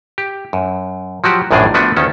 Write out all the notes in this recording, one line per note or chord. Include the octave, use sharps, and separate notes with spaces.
G4
F#2
F3 F#3 F#4 G4
A#1 F#2 A2 D#3 D4 G#4
F3 A3 B3 D4 F#4 B4
D2 D#3 C#4 A4